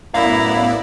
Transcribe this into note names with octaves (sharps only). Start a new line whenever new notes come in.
F#2 A2 B3 E4 D5 F5 A#5